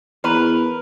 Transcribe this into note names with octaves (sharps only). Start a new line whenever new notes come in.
E2 A#4 B4